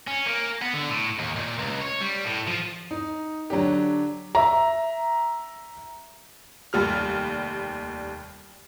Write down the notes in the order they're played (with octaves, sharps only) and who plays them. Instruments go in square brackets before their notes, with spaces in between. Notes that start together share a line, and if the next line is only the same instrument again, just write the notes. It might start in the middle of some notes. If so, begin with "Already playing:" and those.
[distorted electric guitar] C#4
A#3
B3
D3
A2
D#2
A#2
C#2
C#5
G3
A2
F3
[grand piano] D#4
D3 F#3 D4 G4
[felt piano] E5 A#5
[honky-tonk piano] F1 D#2 G3 F6